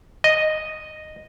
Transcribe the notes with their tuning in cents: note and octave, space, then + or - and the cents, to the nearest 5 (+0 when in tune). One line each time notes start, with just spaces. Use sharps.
D#5 -5